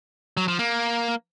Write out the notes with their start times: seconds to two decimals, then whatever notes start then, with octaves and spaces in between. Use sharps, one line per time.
0.37 F#3
0.48 F3
0.59 A#3